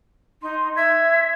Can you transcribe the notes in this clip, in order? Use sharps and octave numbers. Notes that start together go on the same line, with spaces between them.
D#4 C6
E5 G#6